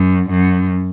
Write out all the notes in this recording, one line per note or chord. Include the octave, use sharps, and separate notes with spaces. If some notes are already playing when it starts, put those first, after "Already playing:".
Already playing: F#2
F#2